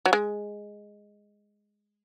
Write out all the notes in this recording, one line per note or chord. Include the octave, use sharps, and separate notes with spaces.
F#3
G#3